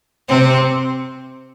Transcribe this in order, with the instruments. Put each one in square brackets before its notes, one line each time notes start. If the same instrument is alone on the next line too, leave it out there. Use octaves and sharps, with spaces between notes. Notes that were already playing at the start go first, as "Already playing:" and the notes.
[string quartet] C3 C4